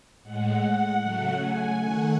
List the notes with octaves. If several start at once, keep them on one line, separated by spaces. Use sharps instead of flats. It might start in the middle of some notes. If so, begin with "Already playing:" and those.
A2 G#3 F#5
F#5
C#3 F#3 A3 F#5
G#5
D#3 A3 F#5